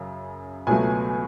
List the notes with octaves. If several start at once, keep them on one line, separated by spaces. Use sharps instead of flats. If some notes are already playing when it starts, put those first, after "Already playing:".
Already playing: F#2 C#3
C#2 B2 F#3 A3 G#5